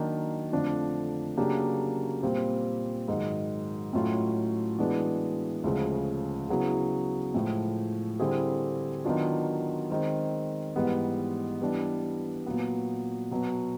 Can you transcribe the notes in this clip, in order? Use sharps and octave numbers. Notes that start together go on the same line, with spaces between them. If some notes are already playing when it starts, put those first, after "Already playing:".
Already playing: D#3 F#3 A#3 D4
F2 D3 F3 A3 D4
C#3 F#3 A#3 D4 G4
A#2 G3 C4
G#2 D#3 F#3
A2 F#3 A3 C#4 F4
E3 G#3 B3 D4 F#4
D2 C#3 F3 G#3
C#3 F#3 B3 E4 G#4
A2 F3 G#3
D3 G3 C4 E4 G#4
D#3 F#3 B3 D4 F4
D#3 G#3 C4
G#2 E3 G3 B3
E3 G3 B3 D4
A#2 F#3 B3
B2 F#3 B3